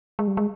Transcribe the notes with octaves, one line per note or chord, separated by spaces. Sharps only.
G#3
G3
G#3